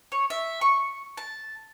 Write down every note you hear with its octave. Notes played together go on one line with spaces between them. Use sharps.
C#5
E5
C#6
A5